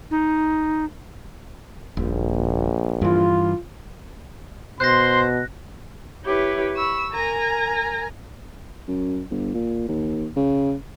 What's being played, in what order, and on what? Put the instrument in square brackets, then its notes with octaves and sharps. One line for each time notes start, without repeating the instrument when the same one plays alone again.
[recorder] D#4
[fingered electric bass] D#1 [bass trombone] A#1
[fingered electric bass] G2 E3 [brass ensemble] F4
[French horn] B2 [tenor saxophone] C5 [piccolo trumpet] C6 [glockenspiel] F#6 A#6
[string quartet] E4 G4 B4 C#5
B5 C#6 E6
A#4 G#5 A#5 A#6
[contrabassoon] F#2
G1
A#2
D#2
C#3